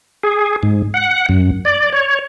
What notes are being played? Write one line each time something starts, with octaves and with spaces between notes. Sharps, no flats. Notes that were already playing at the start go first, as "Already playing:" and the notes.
G#4
G#2
F#5
F#2
D5
C#5